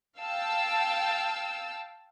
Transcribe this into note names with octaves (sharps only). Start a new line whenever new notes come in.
F5 G5 A5 E6